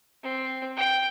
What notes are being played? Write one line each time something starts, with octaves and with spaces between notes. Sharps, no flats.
C4
G5